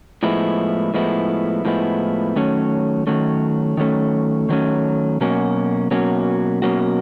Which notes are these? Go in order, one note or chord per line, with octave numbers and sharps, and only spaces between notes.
A2 F3 G#3 B3 E4
A2 F3 G#3 B3 E4
A2 F3 G#3 B3 E4
D#3 F#3 A3 C#4
D#3 F#3 A3 C#4
D#3 F#3 A3 C#4
D#3 F#3 A3 C#4
B2 F#3 A#3 C#4 F#4
B2 F#3 A#3 C#4 F#4
B2 F#3 A#3 C#4 F#4